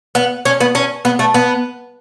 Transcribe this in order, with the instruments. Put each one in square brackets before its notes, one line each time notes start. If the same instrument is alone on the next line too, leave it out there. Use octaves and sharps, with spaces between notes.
[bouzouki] B3
C#4
B3
C#4
B3
A3
B3